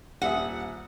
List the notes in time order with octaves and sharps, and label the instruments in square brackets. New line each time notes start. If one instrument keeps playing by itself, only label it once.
[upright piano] D#1 E5 D#6 [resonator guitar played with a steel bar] F#5